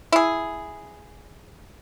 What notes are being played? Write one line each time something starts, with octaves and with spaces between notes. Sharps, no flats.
E4 G#4